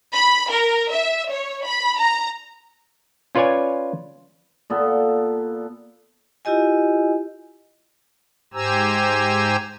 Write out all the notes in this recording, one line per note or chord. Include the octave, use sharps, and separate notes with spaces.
B5
A#4
E5
C#5
B5
A#5
C#4 F4 B4 C#5 D5 G#5
A#2 B3 A4
E4 F4 G4 D#5 G#5
G#2 G4 C5 G#5 A#5 E6